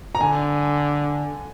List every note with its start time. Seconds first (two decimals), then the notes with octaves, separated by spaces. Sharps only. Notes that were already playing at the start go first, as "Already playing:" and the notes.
0.15 A#5
0.20 D3 G#5